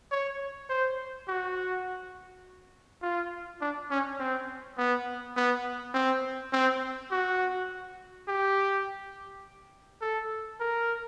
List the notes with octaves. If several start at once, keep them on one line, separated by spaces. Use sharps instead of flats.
C#5
C5
F#4
F4
D4
C#4
C4
B3
B3
C4
C4
F#4
G4
A4
A#4